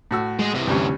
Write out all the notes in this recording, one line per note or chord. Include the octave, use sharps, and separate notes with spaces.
A2 F#4 E6
G#3 D#5
C3 E3
D2 G3 C#4